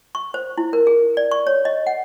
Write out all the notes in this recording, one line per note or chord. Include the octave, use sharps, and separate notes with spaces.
C#6
C5
E4
A#4
G#4
D5
C#6
C#5
D#5
F#5